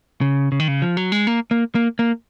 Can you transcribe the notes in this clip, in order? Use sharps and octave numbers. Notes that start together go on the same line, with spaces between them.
C#3
C#3
D#3
C#3
F3
F#3
G#3
A#3
A#3
A#3
A#3